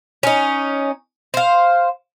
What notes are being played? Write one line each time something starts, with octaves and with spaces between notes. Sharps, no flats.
C#4 D#4
C5 F5